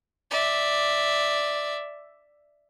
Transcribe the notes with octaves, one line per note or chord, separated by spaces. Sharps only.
D5 E5